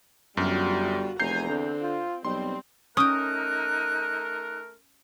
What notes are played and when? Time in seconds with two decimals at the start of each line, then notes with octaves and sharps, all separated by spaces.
0.37 G1 F#2 G3 F4 F#4
1.20 F1 E2 G#5 A#5 G6 C7
1.49 D3 C4
1.82 F4
2.25 B1 G3 C4 C6
2.97 A3 C#4 D#4 A#4 G5 D#6 F#6